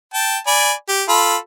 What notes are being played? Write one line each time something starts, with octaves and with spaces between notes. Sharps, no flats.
G5 A5
D5 G#5 B5
G4
F4 A4 B5